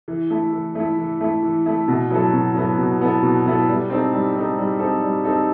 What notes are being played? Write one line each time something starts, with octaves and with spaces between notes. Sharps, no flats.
E3
A3 E4
E3
A3 E4
E3
A3 E4
E3
A3 E4
B2
F#3 B3 E4 A4
B2
F#3 B3 E4 A4
B2
F#3 B3 E4 A4
B2
F#3 B3 E4 A4
G3
C4 D#4 A4
G3
C4 D#4 A4
G3
C4 D#4 A4
G3
C4 D#4 A4